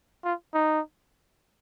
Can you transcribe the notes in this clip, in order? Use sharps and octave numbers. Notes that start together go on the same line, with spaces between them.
F4
D#4